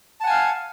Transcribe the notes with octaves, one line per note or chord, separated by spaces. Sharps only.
F5 F#5 G#5 A5